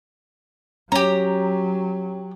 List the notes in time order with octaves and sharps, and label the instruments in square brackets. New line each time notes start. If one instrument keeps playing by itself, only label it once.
[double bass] F#3 [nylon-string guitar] C#4 [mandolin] G4 A#5